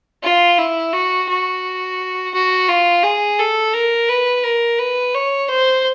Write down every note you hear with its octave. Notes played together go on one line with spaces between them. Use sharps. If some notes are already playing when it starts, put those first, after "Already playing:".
F4
E4
F#4
F#4
F#4
F4
G#4
A4
A#4
B4
A#4
B4
C#5
C5